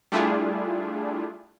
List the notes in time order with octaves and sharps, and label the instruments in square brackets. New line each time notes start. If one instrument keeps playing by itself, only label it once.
[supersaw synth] G3 A3 D4 E4 F4 G#4